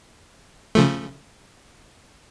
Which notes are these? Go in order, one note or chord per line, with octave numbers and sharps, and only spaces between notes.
C#3 F3 A3